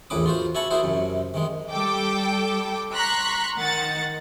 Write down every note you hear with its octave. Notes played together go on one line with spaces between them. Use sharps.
A#1 E2 A2 B4 D6 D#6
F4 F#4 C5
F#4 E5 G#5 A5 B5 C#6
A#3 E4 F#4 G#4 C5
F#2 C3
C3 D#3 G#3
G3 A4 G5 D6
A#5 C6 C#6 F#6 B6
D#3 F#5 A6